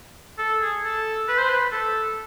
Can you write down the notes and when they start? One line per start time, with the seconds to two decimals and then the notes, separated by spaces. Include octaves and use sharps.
0.38 A4
0.61 G#4
0.84 A4
1.28 B4
1.38 C5
1.49 B4
1.72 A4